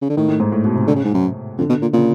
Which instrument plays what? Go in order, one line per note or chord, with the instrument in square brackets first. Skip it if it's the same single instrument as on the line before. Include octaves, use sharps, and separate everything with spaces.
[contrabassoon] C#3
D3
[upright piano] A2 [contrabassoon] D#3
[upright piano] A2
G#2
A2
B2
C3
[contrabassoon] D3
C#3
G#2
F#2
[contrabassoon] F2 [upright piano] D3
[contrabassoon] B2
A#2
[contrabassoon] A#2 [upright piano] C#3